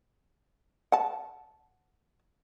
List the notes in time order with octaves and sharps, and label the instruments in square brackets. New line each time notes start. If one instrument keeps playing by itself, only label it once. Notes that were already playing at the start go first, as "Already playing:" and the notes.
[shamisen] F#5 A5